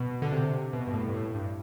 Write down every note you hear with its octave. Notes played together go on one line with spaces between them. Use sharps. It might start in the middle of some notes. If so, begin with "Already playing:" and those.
Already playing: B2
D3
C3
B2
G2
A2
G2
A2
G2